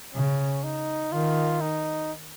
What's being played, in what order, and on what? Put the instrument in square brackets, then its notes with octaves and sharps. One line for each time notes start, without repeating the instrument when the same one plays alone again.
[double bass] C#3 [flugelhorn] C#4
[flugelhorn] D#4
[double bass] D#3 [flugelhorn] F4
[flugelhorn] D#4